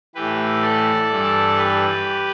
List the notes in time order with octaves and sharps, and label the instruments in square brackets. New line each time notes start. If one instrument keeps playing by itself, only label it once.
[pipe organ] A2 E3 G4 B4
A4 D5
G2 E3
G4 B4